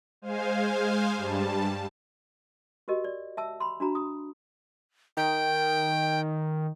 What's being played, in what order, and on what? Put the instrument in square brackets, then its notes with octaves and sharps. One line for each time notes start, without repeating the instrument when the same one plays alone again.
[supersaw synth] G#3 C5 F5 G#5
G2 G3 A5
[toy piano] F#4 G4 A#4 D#5
D5
E5 A5 E6
B5 C6
D4 F#4 A#5 B5
D#6
[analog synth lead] D#3 [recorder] G5